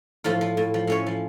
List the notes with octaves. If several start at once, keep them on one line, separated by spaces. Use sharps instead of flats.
A2 F3 F4
F3
A2
F3
A2 C#4 C#5
F3